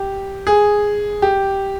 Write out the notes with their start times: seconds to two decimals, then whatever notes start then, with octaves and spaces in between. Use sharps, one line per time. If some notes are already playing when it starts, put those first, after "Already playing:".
Already playing: G4
0.47 G#4
1.22 G4